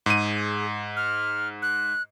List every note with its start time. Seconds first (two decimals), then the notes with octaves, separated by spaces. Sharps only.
0.06 G#2 G#4 D#7
0.97 F6
1.62 F#6